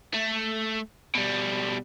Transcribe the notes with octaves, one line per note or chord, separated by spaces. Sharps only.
A3
B2 G3